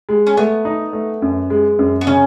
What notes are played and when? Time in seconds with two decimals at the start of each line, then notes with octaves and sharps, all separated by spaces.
0.09 G#3
0.27 C#4
0.37 A3 B3
0.65 D#4
0.93 A3
1.22 F#2
1.50 G#3
1.79 F#2
2.01 B3
2.07 C#3 C#4